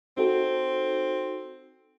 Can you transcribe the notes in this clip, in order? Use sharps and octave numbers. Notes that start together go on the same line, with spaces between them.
C4 D#4 F#4 A4